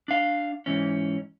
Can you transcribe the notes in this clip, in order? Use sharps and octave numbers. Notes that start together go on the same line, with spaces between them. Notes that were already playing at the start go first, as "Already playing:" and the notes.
D4 F5
G#2 E3 C#4